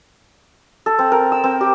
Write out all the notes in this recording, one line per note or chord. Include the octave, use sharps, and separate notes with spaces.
A4
C4
A#4
E6
C4
G4